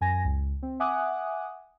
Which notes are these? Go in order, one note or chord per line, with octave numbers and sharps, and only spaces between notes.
F#2 G#5 A#6
C#2
C4
E5 F#5 G#5 D6 D#6 F#6